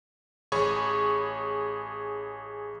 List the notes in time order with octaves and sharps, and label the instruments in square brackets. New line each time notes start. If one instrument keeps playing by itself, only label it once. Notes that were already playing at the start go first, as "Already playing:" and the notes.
[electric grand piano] A1 G#4 C#5 B5 C#6